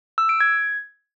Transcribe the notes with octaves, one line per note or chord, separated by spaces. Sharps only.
E6
D7
G#6